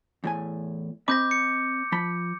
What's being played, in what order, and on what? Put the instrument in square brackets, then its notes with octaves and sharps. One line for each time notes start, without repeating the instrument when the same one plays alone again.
[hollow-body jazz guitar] E2 A2 G#5
[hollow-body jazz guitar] C4 D#5 B5 [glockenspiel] D6 G6 A#6
[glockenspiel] C#7
[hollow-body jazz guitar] F3 B5